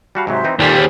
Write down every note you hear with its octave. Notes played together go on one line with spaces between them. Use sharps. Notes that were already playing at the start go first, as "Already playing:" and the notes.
G3 F#4 F5 A5 B5
G#2 C3 F#3 C5 E5
E3 C4 D#4
D#2 D#3 G3 C4 F4 A4 D5 G#5
G#4 C5 C#5